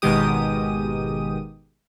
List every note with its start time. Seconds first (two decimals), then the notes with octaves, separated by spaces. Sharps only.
0.02 G#1 B2 D#3 G#3 G4 D#6